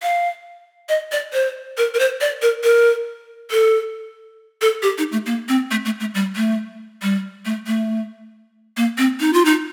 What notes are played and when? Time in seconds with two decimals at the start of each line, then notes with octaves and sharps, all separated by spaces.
0.02 F5
0.89 D#5
1.12 D5
1.33 C5
1.77 A#4
1.94 A#4
1.99 C5
2.21 D5
2.42 A#4
2.64 A#4
3.51 A4
4.61 A4
4.82 G4
4.98 D#4
5.12 A3
5.26 A#3
5.48 C4
5.71 A3
5.85 A3
6.00 A3
6.15 G3
6.36 A3
7.02 G3
7.45 A3
7.67 A3
8.77 A#3
8.98 C4
9.20 D#4
9.33 F4
9.45 D#4